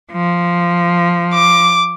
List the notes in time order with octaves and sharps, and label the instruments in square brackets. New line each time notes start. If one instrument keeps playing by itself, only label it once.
[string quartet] F3
[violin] D6